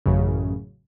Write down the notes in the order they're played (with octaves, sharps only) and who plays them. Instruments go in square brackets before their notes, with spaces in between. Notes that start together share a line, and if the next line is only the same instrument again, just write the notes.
[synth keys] A1 F#2 C#3